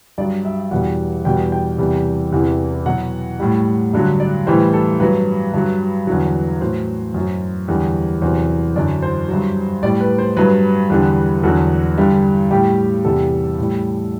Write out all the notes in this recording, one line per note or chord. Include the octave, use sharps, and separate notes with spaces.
G2 F#3 D5
E5
E2 B2 G3 F#5
E2 B2 G3 G5
G5
E2 C3 G3
E2 C3 E3
B2 F#3 F#5
A2 G3
G2 D3 F#3
D5
A2 E3 G3 C5
A4
G2 F#3 B4
G2 F#3
E2 D3 F#3
A2 F#3 C5
F#2 F#3
E2 D3 G3
E2 C3 F#3 C5
F#2 D3 F#3 D5
C5
G2 F#3
A2 G3 D5
B4
C5
G2 F#3 B4
E2 D3 G3
E2 D3 F#3 A4
G2 D3 G3
A2 G3 G4
E2 C3 G3 A4
A2 G3